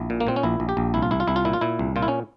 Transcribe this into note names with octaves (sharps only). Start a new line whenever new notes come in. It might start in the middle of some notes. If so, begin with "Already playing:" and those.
Already playing: A#1 E4
A#2
A#3
A#2 C4
C#4
A#1 E4
A#1
G4
A#1
C2 E4
F4
C2 E4
F4
C2 E4
F4
A#2 E4
F4
A#2 E4
C2
A#2 F4
E4
C#4